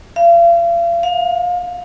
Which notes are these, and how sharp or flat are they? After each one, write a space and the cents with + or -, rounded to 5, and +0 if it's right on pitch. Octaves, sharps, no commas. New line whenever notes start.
F5 -40
F5 +30